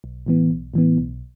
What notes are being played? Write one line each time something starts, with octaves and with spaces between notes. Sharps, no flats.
B1
A2 E3 B3
B1
A2 E3 B3
B1